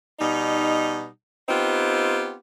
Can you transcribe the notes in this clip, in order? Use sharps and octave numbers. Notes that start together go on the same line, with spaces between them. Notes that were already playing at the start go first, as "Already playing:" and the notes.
B2 G3 D#4
B3 C4 D#4 F4 G4